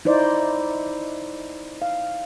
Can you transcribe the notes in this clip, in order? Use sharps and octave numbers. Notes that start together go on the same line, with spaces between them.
D#4 E4 C5 D5
F5